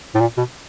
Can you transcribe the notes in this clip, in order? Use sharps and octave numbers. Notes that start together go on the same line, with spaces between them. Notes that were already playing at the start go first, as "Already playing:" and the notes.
A2
A#2
B2